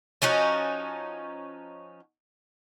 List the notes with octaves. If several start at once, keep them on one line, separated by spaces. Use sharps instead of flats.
F3 C#4 D#4 F#4